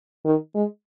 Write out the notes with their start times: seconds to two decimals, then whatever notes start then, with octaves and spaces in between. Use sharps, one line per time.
0.25 D#3
0.55 G#3